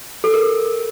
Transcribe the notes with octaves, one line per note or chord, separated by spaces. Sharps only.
A4
A#4